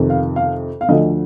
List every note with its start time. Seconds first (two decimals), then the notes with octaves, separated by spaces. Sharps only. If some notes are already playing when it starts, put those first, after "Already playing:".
Already playing: F2 C3 D#3
0.10 F5
0.36 F5
0.81 F5
0.89 D2 D3 F3 D#5